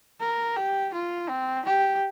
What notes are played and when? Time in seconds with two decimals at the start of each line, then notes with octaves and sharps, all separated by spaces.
0.21 A#4
0.56 G4
0.93 F4
1.29 C4
1.66 G4